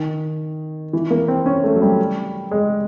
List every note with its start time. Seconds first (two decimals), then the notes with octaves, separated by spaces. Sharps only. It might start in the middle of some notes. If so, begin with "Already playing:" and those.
Already playing: D#3
0.93 E3
1.10 A#3
1.28 C4
1.46 C#4
1.64 A3
1.76 F#3
1.81 G3
2.51 G#3